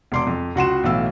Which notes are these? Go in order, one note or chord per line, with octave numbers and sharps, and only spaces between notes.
E1 C6 D6
F2
C#2 F#4 C6 E7
B1 A2 E3 F5 E6